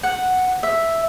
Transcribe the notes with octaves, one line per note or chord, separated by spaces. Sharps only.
F#5
E5